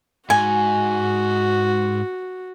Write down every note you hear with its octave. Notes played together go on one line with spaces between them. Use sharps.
G#2 F#4 G#5